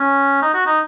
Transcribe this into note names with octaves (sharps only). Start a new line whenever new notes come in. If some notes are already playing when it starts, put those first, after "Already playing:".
Already playing: C#4
D#4
F#4
D#4